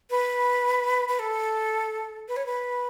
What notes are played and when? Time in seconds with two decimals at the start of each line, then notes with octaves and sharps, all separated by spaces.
0.10 B4
1.08 B4
1.19 A4
2.28 B4
2.36 C#5
2.46 B4